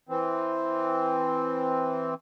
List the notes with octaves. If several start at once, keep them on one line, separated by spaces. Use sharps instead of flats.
E3 C4